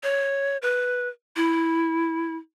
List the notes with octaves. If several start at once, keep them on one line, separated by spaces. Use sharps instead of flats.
C#5
B4
E4